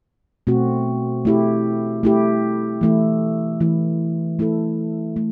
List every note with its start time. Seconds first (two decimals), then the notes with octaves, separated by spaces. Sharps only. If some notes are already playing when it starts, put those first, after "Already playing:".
0.47 B2 A3 C4 F#4
1.25 A3 E4 G4
2.03 A3 E4 G4
2.81 E3 A3 E4
3.60 E3 A3 E4
4.39 A3 E4 A4
5.16 A3